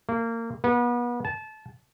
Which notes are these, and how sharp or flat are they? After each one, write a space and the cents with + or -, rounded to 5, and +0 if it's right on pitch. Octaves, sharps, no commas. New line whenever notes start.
A#3 -25
B3 -35
A5 -25